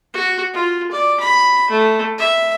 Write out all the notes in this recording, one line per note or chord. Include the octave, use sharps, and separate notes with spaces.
F#4
F4
D5
B5
A3
E5